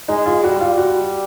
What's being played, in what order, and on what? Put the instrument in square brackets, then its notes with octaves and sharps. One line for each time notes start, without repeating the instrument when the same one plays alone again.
[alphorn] G#3 [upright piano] D#4
[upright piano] F4
[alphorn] G3 [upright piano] F#4
[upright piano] F4
F#4